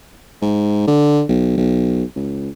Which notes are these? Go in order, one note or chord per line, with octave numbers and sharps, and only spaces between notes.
G#2
D3
B1
B1
C#2